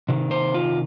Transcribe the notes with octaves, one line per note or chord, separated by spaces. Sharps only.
C3 D#3
C5
F4